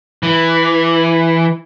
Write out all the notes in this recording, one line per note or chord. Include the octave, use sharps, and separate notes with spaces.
E3